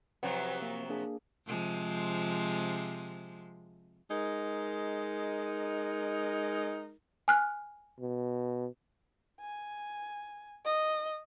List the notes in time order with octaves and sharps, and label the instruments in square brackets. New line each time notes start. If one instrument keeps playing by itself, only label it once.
[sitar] C3 F3 F#3 [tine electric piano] B4 F#5
[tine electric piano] A#3
A#3 D4 G#4
[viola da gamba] C3 F3 G#3
[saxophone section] G#3 D#4 A#4
[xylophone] G#5 F6 F#6
[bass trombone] B2
[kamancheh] G#5
D#5